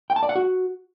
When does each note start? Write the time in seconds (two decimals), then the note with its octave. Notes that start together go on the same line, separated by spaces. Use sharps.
0.10 G5
0.16 A5
0.23 D5
0.29 F#5
0.35 F#4